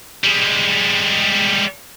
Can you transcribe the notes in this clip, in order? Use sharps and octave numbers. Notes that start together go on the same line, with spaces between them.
G3 G#3